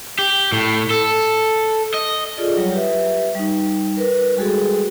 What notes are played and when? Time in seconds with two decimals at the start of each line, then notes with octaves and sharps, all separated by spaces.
0.19 G4
0.52 A2
0.90 A4
1.94 D#5
2.37 F4 G#4 A4 D5 D#5
2.57 F#3 G3 C#5
2.72 G4 B4 E5
3.35 G3 D#4
3.97 A#4 B4
4.37 G3 G#3 F#4 G#4 A4